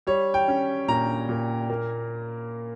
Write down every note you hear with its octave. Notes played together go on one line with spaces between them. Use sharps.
G3 C#5
G5
C#4
A#2 A#5
A#2
A#3